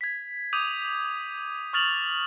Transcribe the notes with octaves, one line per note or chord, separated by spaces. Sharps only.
G#6 B6
D6 D#6 G6 D#7 F7
C#6 D#6 F6 A6 F7 F#7